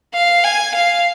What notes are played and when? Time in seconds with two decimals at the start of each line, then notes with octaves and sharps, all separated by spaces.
0.14 F5
0.44 G#5
0.75 F5